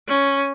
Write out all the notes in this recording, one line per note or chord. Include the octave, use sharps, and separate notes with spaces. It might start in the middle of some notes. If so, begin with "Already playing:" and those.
C#4